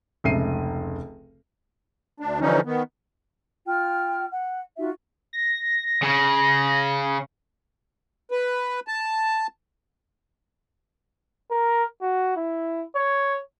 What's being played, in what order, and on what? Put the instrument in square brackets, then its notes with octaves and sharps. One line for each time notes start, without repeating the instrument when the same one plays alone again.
[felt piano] F1 C#2 E5 C7 D#7
[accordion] D2 D4
D3 E3 F3 G3 C#4 D#4
D#3 B3
[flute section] F4 G5 F6
F#5
D#4 F4 F#4 E5
[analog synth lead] A#6
[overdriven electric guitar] C#3
[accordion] B4
A5
[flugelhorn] A#4
F#4
E4
C#5